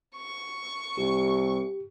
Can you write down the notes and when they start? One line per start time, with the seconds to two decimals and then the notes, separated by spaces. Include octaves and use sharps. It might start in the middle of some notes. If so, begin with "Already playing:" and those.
0.16 C#6
0.98 C2 G4